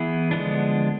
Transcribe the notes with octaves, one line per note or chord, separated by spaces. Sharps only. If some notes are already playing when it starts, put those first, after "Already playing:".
Already playing: E3 B3 E4 G#4
D3 F3 G#3 B3 D4